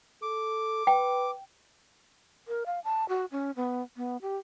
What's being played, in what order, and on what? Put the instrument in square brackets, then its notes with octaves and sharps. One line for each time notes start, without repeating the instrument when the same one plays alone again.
[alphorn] A4 [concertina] D6
[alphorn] B4 [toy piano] G5
[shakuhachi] A#4
F5
A5
F#4
C#4
B3
B3
G4